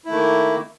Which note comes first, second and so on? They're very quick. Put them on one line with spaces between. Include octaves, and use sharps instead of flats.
E4 A3 D#3 A#3